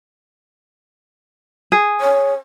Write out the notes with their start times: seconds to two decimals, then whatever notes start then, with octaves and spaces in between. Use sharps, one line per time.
1.72 G#4
2.01 C#5